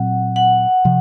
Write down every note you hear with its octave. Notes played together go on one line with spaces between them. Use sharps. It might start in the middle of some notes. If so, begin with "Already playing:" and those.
Already playing: A#2 F#3 C4 F#5
F#5
C3 F3